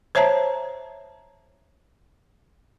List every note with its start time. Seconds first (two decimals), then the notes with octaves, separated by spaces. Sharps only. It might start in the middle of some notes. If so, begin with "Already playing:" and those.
0.15 C5 C#5 E5 A5 A#5